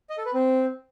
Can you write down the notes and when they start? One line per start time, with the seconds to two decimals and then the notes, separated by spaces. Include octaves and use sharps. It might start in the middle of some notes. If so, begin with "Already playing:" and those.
0.10 D#5
0.18 A4
0.26 B4
0.34 C4